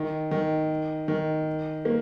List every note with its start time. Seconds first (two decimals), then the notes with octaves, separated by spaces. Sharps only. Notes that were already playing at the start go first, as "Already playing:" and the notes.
Already playing: D#3
0.31 D#3
1.08 D#3
1.85 A#3